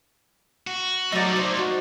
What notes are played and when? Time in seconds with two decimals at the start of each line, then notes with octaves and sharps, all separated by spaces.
0.67 F#4
1.12 F#3 A3 A#3 D#4 D5
1.37 C5
1.58 F#4